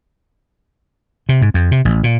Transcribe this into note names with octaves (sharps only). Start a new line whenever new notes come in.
C3
G#2
F2
C3
A1
A#2